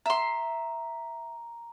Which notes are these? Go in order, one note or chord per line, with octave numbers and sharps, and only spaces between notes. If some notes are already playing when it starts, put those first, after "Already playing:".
E5 A#5 C6